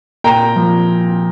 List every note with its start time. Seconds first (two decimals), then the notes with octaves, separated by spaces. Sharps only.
0.24 A#2 G5 A#5
0.56 F3